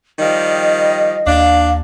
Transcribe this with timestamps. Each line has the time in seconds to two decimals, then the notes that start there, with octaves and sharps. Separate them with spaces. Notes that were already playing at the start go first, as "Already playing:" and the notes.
0.19 D#3 F3 G3 D#5
1.27 D#2 D4 F5